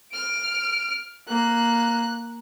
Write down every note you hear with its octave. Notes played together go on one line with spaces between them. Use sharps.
F6 D7
A#3 F#6